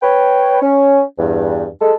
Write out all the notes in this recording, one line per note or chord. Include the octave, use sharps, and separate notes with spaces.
B4 C#5 G5
C#4
E2 G2
G#3 A4